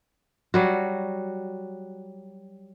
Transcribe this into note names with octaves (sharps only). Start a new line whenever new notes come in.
F#3 G3 F#4